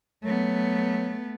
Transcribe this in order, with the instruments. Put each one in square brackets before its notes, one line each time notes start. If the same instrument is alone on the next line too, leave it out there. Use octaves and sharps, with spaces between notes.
[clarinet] F#3 [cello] A3 B3